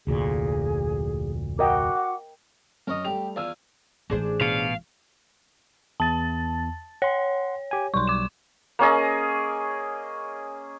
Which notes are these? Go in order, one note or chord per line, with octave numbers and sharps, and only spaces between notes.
F1 D2 A#2 G#4
F#4 A#4 D#5 F#5 G5 D6
F#2 A#4 C#5 D#5
G3 A3 G4 F7
E2 F4 D5 G#5 E6
A1 A3 D4 G#4 C5
B2 F5
E2 A5 A6
C#5 F#5 C6
G4 G#5
B1 G3 C6 C#6
D6 E7
A#3 C#4 G#4 D#5